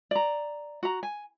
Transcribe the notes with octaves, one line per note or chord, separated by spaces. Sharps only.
D5 A#5
F#4 A#5
G#5